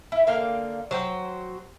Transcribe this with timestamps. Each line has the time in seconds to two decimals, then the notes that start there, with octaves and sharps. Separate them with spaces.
0.12 E4
0.27 D3 A#3 F5 G5
0.91 F#3 C5 G5